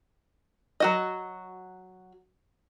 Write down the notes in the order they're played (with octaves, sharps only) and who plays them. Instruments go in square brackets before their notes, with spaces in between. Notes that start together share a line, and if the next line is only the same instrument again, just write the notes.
[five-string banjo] F#3 F#4 D#5